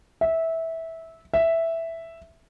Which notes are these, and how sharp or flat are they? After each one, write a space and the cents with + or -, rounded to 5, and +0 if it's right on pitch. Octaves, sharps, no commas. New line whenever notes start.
E5 -15
E5 +0